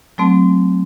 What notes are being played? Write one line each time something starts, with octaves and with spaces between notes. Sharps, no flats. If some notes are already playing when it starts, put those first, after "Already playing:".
F#3 A3 C4